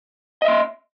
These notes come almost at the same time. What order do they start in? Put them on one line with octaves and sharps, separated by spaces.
D#5 E5 C6